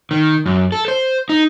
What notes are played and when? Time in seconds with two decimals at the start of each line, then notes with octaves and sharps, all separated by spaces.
0.11 D#3
0.46 F#2
0.72 A4
0.88 C5
1.29 D#4